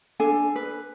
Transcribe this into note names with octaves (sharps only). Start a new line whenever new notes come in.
D4 A4 G#5
B4